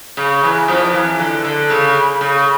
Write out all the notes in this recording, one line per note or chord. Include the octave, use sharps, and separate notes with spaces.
C#3
E2 E3
F2 F3
E2 E3
D3
D3
C#3
C#3